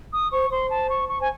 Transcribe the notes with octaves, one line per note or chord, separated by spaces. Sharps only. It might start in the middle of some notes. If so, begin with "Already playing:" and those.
D#6
C5 C#6
C5 C6
A5
C#6
C#6
C5 G#5